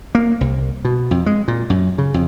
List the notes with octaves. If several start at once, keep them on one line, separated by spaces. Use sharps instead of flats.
A#3
C2
B2
F2
G#3
A#2
F#2
C#3
F2